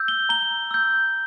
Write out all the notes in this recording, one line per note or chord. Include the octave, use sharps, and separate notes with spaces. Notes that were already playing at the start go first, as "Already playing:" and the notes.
Already playing: E6 G6
G7
A#5 G7
E6 G6